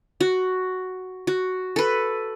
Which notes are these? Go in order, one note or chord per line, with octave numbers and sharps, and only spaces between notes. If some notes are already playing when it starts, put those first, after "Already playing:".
F#4
F#4
A4 B4